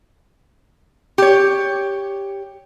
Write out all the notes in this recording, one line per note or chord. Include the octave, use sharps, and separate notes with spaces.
G4 C#5